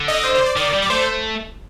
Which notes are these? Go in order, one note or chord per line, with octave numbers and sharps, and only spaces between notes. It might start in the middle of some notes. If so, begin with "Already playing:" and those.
Already playing: D3
D#5
C5
C5
D5
D#3 D5
G3
D5
A3 C5